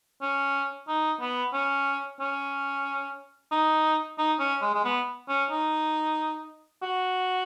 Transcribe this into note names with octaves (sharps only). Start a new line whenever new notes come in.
C#4
D#4
B3
C#4
C#4
D#4
D#4
C#4
G#3
G#3
B3
C#4
D#4
F#4